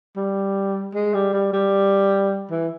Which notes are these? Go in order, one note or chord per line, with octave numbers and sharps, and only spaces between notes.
G3
G#3
G3
G3
G3
E3